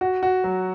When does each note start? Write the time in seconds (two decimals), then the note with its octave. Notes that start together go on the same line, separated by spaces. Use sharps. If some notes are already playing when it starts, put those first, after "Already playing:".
0.01 F#4
0.23 F#4
0.44 F#3